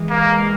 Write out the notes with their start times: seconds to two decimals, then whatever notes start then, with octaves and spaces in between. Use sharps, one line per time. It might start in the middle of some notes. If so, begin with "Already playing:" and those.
Already playing: E3 G#3
0.10 A#3